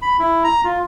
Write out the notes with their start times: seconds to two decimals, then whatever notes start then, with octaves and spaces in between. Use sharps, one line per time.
0.02 B5
0.19 E4
0.44 A#5
0.64 F4